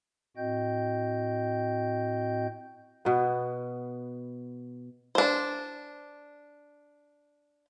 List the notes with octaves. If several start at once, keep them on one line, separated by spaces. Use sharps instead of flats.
A2 C4 F#4 D#5 G5 G6
B2 B3
D4 C5